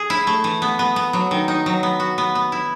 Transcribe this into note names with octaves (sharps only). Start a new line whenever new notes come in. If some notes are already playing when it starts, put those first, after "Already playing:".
Already playing: G#4
E4
A3
E3
B3
B3
B3
F#3
D#3
D#4
F#3
B3
F#4
B3
B3
E4